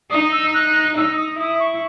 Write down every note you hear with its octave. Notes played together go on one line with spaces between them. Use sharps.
D#4 D#6
E6
F#6
D#4 E6
D#6
E4 D#6
C#6